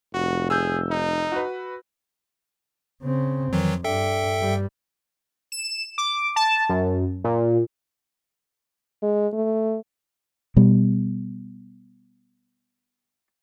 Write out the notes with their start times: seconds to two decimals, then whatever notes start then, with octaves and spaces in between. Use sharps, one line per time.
0.14 F1 F#4
0.50 G#4 E6 G6
0.90 D#4
1.32 F#4 B4
3.03 C#3 C4
3.53 F2 D#3 E3 F#3
3.84 G2 D4 A4 E5 G5
4.39 G2 G3
5.52 E7
5.98 D6
6.36 A5
6.69 F#2
7.24 A#2
9.03 G#3
9.33 A3
10.56 B2 G3